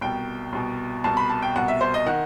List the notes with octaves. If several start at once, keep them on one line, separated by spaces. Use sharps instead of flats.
C2 B2 G5
C2 B2
C2 B2 A5
B5
A5
G5
C2 B2 F#5
E5
C5
D#5
D#3 F#5